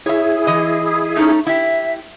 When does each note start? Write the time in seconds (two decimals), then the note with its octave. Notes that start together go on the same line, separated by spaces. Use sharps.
0.06 E4 G#4 C#5 E5
0.47 E3 D#5
1.17 A3 C#4 D#4
1.47 E4 G4 E5